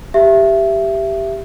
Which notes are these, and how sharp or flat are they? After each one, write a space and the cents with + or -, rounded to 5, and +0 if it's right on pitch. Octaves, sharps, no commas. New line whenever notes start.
G4 +0 E5 +15